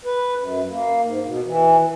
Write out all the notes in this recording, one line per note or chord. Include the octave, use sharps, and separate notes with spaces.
B4
F#2
A#3
G#2
B2
E3